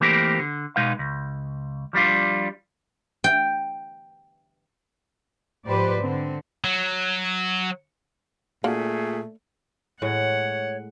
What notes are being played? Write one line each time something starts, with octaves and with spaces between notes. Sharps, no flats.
E3 A3 A#3 C4 G4 A#4
D3
B2 G#3 D#4 B4 F5
C#2
F3 G3 D4 F4
G5
G#2 F3 G4 B4 C5 D5
D3 C4
F#3
A#2 A3 A#3 D4 F#4 G#4
A2 G#3 C#5 F#5